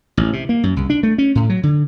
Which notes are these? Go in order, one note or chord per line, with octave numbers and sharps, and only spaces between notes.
A1
C3
A#3
F#2
C2
D4
A3
C#4
A2
F#3
D3